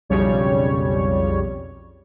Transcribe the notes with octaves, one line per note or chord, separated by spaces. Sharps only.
B1 F2 C#3 G3 C#5